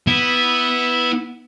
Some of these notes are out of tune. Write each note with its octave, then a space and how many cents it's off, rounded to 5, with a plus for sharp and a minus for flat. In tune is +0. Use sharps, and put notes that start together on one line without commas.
B3 +0 E4 -10